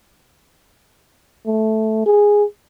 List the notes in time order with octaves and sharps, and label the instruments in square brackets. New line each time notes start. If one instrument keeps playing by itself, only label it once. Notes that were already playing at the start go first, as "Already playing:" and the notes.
[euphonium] A3
G#4